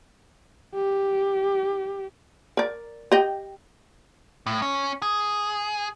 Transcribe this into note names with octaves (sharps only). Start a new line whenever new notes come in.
G4
A#4 D5
G4 D#5 G5
A2
C#4
G#4